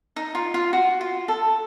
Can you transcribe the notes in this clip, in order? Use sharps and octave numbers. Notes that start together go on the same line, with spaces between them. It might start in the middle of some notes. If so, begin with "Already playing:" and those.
D#4
F4
F4
F#4
F4
A4